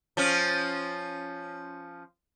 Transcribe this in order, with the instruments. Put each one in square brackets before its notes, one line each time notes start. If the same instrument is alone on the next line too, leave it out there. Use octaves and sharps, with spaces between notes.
[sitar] F3 C#4